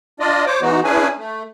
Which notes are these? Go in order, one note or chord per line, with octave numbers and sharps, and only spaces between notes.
D4 F4 D5 D#5
C5 C#5 D6
E3 G#3 B3 D#4 F#4
C#4 D4 E4 G#4 B4 G#5
A3